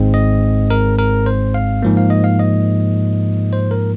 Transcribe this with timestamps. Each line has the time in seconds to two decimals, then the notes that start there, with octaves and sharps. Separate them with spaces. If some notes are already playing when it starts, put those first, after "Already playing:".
Already playing: G#1 G#2 G#3 C4
0.14 D#5
0.70 A#4
0.99 A#4
1.26 C5
1.54 F5
1.82 G#2 F3 A#3
1.97 F5
2.10 D#5
2.24 F5
2.39 D#5
3.53 C5
3.71 A#4